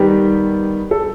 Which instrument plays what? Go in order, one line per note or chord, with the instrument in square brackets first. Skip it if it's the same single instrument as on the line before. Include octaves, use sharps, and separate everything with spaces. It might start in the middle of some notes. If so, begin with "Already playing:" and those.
Already playing: [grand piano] D#3 G3 B3 [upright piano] G4
[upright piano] A4